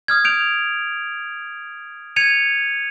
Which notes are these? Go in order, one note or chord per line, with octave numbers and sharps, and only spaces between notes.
D#6 F6 G#6
G6 D7 F7
G#6 C#7 D#7 F7